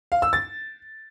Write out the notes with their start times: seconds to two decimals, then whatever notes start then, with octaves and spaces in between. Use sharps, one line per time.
0.12 F5
0.22 E6
0.33 A6